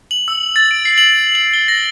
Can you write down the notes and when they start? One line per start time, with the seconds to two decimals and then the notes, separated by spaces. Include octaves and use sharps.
0.11 F#7
0.28 E6
0.56 A6
0.71 D7
0.85 C7
0.98 F#7
1.35 F#7
1.53 G7
1.68 A#6